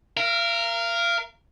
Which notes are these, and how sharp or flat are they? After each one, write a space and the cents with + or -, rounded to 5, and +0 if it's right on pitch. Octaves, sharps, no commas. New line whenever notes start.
A#4 +0 F5 -40